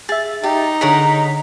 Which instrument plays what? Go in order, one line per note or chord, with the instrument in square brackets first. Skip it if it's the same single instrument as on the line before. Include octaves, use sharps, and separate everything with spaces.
[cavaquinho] G#4 [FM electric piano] E5 A6
[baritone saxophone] D#4 [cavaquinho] G4
[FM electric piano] D3 C#5 B6 [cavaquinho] G#4 A#4 F#5